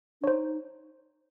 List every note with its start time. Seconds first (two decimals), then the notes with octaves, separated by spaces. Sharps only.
0.21 D4 C#5
0.27 D#4 C5